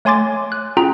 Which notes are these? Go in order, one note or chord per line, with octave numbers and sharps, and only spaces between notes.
A3 C#5 G#5 C6 D6 A6
F#6
C#4 F4 G#4 G5 A#5